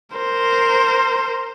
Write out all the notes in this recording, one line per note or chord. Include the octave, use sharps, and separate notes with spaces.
A#4 C5